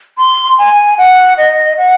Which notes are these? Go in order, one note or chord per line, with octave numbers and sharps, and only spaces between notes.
C6
G#5
F#5
D#5
F#5